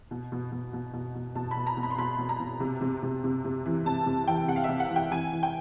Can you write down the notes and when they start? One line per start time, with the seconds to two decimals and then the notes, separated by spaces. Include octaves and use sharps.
0.11 B2
0.32 B2
0.52 B2
0.73 B2
0.93 B2
1.15 B2
1.35 B2 A5
1.51 B5
1.56 B2
1.67 A#5
1.77 B2
1.83 B5
1.90 C6
1.98 B2 B5
2.18 B2
2.29 A#5
2.40 B2
2.60 C3
2.81 C3
3.03 C3
3.24 C3
3.44 C3
3.65 E3
3.85 C3 A5
4.06 C3
4.27 E3 G5
4.48 C3 F#5
4.56 F5
4.64 C3 E5
4.80 F#5
4.90 E3
4.96 G5
5.10 E3 G#5
5.32 E3
5.43 G5